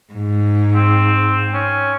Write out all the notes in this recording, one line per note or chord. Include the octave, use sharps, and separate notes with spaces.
G#2
C4
C#4